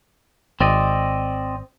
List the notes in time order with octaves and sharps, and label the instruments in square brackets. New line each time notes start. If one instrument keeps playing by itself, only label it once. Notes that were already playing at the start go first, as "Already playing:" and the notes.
[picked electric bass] G#1 [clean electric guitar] C4 D5 D#5